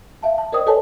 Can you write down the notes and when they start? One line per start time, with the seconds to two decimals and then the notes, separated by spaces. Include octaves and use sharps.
0.23 E5 F5 A5
0.38 A5
0.52 A#4 C5 D5 D#5 G5 D#6
0.67 A4 B4 C#5 D5 G#5 A5